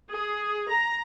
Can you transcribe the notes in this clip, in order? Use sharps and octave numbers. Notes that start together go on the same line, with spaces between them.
G#4
A#5